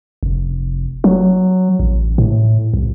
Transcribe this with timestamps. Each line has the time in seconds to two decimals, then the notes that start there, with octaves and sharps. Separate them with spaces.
0.23 F1
1.04 F#3
1.79 A1
2.18 A2
2.74 C2